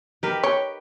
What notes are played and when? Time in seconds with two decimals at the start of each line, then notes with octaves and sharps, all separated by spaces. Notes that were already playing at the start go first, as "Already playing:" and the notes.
0.23 D#4 G4 A#4 B4
0.43 C#5 G5